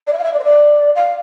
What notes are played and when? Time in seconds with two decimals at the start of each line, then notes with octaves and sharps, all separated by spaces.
0.07 D5
0.13 E5
0.18 F5
0.23 E5
0.33 D5
0.39 C5
0.44 D5
0.95 F5